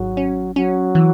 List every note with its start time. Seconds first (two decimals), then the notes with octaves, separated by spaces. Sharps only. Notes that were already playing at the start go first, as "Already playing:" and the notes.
Already playing: G#1 F#3
0.17 C#4
0.55 F#3 C#4
0.95 E3